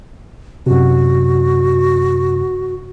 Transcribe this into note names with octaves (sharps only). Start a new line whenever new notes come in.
F#2 C3 F#4